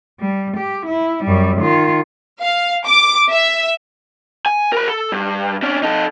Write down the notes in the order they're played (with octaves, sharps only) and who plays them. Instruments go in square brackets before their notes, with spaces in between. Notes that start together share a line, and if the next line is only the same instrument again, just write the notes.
[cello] G3
G4
E4
F#2 G3
D#3 F4
[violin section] F5
D6
E5
[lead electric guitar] G#5
A#4 B5
A4
G2
C#4 D4
D#4 A4